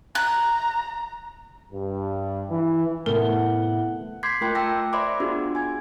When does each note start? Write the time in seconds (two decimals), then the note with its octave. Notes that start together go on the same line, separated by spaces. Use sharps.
0.15 A#5 F#6
1.72 G2
2.50 E3
3.06 A2 C3 A3 B3 E4 A#4 F#5
4.23 C6 D6 G6 G#6 B6 C7
4.41 A3 F4 A#4 G5 C6 F#6
4.55 G5 A5 D6 E6 A#6
4.93 C5 D5 E5 B5 C6 D6
5.20 B3 D4 F4 F#4 G#4
5.55 G#5 G#6